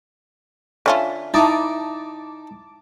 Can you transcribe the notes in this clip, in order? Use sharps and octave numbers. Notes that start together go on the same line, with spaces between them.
D3 C#4 F4 C#5 E5 A5
D#4 E4 A5 A#5 D6 D#6